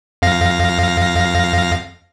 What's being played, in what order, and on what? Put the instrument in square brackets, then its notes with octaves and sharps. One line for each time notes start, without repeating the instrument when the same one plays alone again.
[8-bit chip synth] F2 F5 A#6